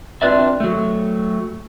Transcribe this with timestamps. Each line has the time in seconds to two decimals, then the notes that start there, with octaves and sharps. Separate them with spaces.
0.22 C4 D4 F4 B4 D5 E5
0.60 F#3 A3